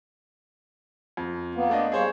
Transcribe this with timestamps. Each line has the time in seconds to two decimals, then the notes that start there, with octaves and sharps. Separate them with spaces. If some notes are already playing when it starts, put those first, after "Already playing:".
1.17 F2
1.55 A#3 B3
1.69 A3 D4 D#5
1.92 G3 A#3 G#4 C5 C#5